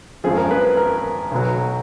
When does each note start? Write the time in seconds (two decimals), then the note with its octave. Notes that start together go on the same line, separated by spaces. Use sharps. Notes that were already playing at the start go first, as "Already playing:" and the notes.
0.24 G#1 F#2 F3 G#4
0.38 A#4
0.51 B4
0.64 B4
0.77 A#4
1.31 B1 B2 F#3